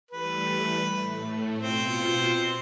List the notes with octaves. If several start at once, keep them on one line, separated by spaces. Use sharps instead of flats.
E3 G3 A3 B4
A2 A3
B2 C4 F4 C5 C#7